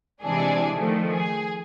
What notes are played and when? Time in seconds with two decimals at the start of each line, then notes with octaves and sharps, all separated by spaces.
0.23 C3 E3 G#3 D4 G#4
0.74 D#3 F3 A3
1.12 G#4